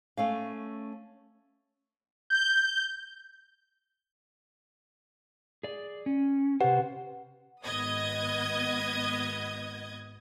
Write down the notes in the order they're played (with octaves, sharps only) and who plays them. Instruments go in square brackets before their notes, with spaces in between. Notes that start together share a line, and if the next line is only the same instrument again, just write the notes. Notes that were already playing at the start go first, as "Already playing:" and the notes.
[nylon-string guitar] A3 C#4 F5
[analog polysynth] G6
[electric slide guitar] G#4 D5
C#4
[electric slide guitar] C3 C5 [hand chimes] G4 B4 F#5
[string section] G#1 B3 D#5 D#6 G#6